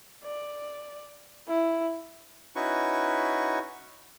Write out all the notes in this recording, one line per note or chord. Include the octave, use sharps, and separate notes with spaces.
D5
E4
C#4 D#4 E4 F#4 B4 C#6